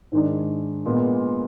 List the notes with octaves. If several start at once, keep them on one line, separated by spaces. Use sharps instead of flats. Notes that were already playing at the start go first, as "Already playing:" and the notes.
G#2 D#3 G#3 D4
A#2 G#3 B3